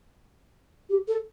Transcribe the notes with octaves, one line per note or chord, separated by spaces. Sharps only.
G4
A4